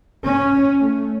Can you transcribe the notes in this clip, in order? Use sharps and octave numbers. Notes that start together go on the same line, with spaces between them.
C#4
A3